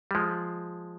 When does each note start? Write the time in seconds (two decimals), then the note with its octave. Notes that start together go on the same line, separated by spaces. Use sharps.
0.11 G3
0.15 F3 G#3